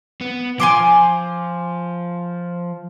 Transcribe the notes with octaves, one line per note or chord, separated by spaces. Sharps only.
B3
F3 G#5 C6 D6